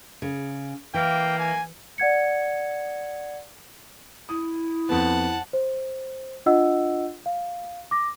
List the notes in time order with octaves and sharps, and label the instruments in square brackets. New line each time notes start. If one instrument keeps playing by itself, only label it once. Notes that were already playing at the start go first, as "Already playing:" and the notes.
[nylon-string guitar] C#3
[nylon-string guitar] E3 [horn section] A#3 [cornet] G5
[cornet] G#5
[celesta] D5 F#5 G#6 C#7
[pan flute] E4 [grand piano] D#6
[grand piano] F2 B3 [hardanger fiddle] F#5 A5
[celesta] C5
D4 F4 D#5 F#5 E6
F5
D6 A#6